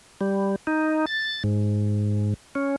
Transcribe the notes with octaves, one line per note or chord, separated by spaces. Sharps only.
G3
D#4
A6
G#2
C#4